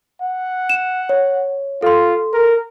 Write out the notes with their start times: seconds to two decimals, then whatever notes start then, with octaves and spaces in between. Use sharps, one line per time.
0.21 F#5
0.70 E7
1.09 C#5
1.82 F4 A4 C6
2.33 A#4